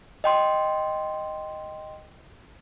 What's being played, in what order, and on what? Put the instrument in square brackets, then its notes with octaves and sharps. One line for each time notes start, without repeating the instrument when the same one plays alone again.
[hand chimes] D#5 G5 C6